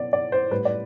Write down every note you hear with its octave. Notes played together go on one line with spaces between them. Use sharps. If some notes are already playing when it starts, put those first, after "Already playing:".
Already playing: B2 D5
D5
C5
A2 G3 B4
D5